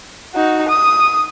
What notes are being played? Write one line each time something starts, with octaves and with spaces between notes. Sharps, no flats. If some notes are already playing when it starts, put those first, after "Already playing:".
D#4 F#4
D#6